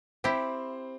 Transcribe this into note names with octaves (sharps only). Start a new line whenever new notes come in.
C4 E4 G4 C5